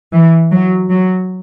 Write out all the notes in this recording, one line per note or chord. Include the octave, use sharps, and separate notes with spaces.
E3
F#3
F#3